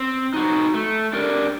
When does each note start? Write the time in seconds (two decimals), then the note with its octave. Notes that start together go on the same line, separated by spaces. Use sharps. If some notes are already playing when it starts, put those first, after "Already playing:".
Already playing: C4
0.34 D#4 F#4
0.74 A3
1.13 D4 G4 A#4 D5